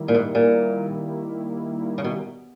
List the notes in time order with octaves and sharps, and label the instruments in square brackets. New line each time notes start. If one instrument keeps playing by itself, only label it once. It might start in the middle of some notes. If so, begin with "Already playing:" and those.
Already playing: [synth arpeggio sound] D#3 G3 A#3 E4
[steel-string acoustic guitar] A#2
G#2
A#2
C#3
B2